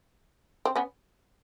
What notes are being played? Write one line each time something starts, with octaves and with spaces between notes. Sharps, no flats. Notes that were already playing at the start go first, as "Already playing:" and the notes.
C4
B3 C#4